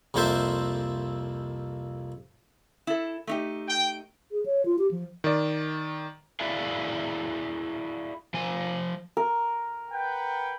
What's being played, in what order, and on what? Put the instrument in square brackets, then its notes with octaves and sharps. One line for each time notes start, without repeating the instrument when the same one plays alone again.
[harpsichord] C2 F2 A#3 A4 C5 E5
[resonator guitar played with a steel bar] E4 A4
A3 D#4 G4
[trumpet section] G5
[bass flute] G#4
C#5
F4
G4
F3
[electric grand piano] D#3 D5
[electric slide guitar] E4 F#4 G#4 D5 E5 F5
F3 G#5
[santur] A#4
[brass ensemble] B4 F#5 G5